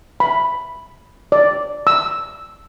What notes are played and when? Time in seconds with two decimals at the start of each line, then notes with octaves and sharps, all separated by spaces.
0.20 B5
1.32 D5
1.87 E6